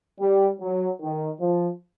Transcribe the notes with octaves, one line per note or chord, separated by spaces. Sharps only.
G3
F#3
D#3
F3